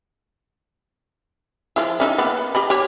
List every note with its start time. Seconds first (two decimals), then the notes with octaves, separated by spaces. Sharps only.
1.76 F3 E4
2.00 C#4 D#4 E5
2.18 A#3 B3
2.55 G4 D#5 B5
2.70 G4 C#5